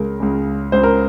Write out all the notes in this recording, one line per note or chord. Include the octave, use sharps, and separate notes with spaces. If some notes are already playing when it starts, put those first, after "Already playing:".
Already playing: C#2 C#3 A#4
C#2 C#3
C#2 C#3 C5
A#4